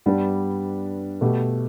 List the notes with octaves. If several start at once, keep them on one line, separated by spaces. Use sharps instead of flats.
G2 G3 B3 D4
B2 A3 G4